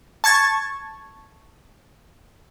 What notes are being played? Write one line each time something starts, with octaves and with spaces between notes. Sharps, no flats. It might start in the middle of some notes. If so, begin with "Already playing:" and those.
A5 C#6 G#6 A6